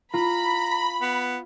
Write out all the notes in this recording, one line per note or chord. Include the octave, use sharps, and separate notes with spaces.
F4 A#5 B5
B3